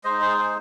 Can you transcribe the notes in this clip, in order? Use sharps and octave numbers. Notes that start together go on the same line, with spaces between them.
G#3 D#4 C5 D#5
G#4 C5
G#4 C5